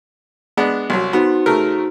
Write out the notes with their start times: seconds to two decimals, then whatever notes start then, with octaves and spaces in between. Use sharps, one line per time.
0.57 G#3 B3 D4
0.90 C2 F#3
1.13 B3 D#4 F#4 C5
1.46 C#3 A3 A#4